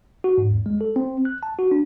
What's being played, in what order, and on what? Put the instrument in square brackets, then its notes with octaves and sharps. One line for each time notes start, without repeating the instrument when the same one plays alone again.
[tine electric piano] F#4
G#2
E2
G#3
A4
C4
F#6
A5
F#4
D4